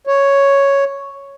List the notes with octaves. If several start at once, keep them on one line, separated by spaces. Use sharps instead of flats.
C#5